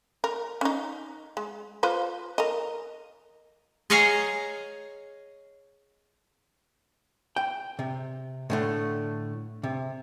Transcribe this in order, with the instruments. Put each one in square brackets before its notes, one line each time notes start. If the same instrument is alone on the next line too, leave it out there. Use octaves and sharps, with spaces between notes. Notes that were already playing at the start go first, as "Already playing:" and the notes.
[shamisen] A#4
C#4 D#4
G#3
F4 B4 C5
A#4 D#5
[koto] G#4 C#5 D#5 F5 G#5 A#5
[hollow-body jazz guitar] G5
C3
A2 D3 A3
C3